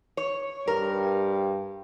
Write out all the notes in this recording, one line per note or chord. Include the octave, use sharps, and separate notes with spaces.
C#5
G2 A#4